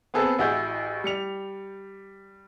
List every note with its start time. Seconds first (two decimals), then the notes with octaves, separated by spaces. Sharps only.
0.14 B3 C4 G#4 A4 B4
0.39 A1 E4 F#4 G#4 G6
1.04 G3 C#7 F7